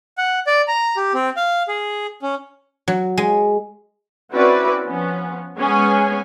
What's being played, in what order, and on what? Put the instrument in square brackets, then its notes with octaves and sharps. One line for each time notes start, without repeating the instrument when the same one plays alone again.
[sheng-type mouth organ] F#5
D5
A#5
G4
C4
F5
G#4
C#4
[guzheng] F#3
G#3
[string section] C4 C#4 E4 F#4 B4 D5
F3 B3 C#4
G#3 B3 C#4 G#4 C#5 G#5